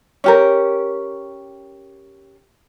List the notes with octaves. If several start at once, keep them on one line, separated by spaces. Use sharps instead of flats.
C#4 G4 A#4